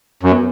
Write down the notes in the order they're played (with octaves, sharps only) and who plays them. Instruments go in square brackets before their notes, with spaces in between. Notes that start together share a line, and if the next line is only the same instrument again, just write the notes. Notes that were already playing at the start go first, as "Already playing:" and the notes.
[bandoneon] F#2
[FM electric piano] B3